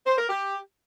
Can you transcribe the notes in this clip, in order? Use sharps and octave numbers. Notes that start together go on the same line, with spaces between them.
C5
A#4
G4